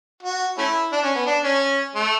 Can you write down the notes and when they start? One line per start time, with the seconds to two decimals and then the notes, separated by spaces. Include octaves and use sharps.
0.23 F#4
0.58 A3 C#4 E4
0.92 D4
1.03 C#4
1.15 B3
1.26 D4
1.44 C#4
1.95 A3